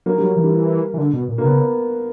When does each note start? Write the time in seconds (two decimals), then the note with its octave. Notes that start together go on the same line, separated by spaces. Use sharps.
0.06 F#3 A#3
0.18 F#3 G3
0.36 E3
0.44 G3
0.94 E3
0.98 D3
1.13 B2
1.29 A#2
1.38 B2 A#3
1.44 C#3 B3